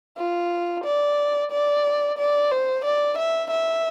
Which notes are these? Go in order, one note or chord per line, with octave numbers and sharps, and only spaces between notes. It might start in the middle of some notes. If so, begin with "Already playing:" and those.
F4
D5
D5
D5
C5
D5
E5
E5